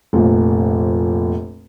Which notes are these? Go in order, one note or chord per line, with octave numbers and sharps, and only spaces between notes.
F1 A#1